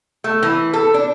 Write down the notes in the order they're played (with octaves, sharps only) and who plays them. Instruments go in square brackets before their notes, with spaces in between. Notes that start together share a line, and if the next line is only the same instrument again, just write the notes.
[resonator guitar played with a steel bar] A3
E3
A4
D4